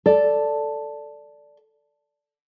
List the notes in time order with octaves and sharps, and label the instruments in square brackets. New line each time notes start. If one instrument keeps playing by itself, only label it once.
[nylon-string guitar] A4 D5